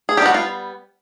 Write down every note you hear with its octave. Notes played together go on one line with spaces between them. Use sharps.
G#4
G3 B3 D#4 G4
F#4
F4